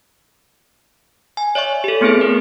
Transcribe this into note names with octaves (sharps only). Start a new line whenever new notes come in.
G#5
C#5 D5 E5 C#6
G4 A4
A3 B3 C4 E4 G#4 B4
A#4